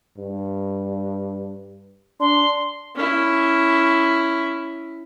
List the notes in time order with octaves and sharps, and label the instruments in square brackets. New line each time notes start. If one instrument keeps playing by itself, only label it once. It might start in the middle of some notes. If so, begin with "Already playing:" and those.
[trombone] G2
[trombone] D4 [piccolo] C6
[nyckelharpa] C#4 E4